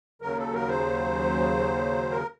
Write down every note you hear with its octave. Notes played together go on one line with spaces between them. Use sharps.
D#2 C#3 F#3 A#4
A4
A#4
C5
A#4